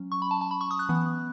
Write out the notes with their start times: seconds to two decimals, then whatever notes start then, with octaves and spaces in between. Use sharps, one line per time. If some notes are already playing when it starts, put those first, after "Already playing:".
Already playing: F#3 C#4
0.12 C#6
0.22 B5
0.31 A5
0.41 A5
0.51 B5
0.61 C#6
0.71 D#6
0.79 F#6
0.89 E3 B3